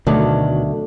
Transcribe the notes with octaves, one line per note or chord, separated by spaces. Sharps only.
D2 B2 D#3 F#3